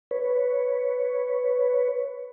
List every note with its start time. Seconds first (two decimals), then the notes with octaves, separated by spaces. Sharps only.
0.11 B4 C#5